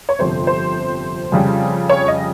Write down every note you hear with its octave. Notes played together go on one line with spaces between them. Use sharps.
C#5
G1 F2 C3 C5
C5
F2 C#3 G3
C#5
D#5